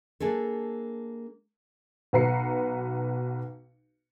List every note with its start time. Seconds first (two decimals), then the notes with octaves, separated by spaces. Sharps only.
0.20 A#3 D4 G#4 A4
2.13 B1 F#4 B4 A#5 C7 C#7